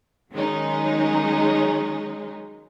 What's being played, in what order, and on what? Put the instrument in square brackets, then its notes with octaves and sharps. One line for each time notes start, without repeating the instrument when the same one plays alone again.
[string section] D#3 F#3 G#3 C#4 D#4